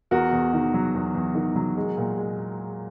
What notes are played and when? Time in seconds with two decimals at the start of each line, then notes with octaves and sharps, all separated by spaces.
0.11 E2 F#4 A#4
0.32 E2
0.53 D#3
0.74 F#3
0.94 E2
1.14 E2
1.35 D#3
1.56 F#3
1.77 G#3
1.97 A#2
2.18 G#3